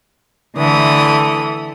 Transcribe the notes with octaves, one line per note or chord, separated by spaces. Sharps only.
D3 E3 A3 D#6